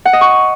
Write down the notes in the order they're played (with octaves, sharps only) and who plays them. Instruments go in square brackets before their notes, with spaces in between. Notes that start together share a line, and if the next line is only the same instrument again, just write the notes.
[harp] F#5
D#5
C#6